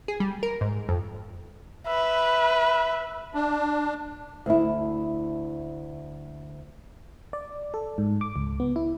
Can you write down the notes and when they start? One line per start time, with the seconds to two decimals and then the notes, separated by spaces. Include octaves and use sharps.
0.08 G#4
0.20 G3
0.43 A#4
0.61 G#2
0.89 F2
1.87 B4 E5
3.34 D4
4.46 D2 E4
7.33 D5
7.74 A4
7.98 G#2
8.21 D6
8.36 C#2
8.60 B3
8.76 E4